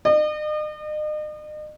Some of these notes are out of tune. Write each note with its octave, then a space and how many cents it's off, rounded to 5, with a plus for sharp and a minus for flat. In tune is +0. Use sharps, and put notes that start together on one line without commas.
D#5 -40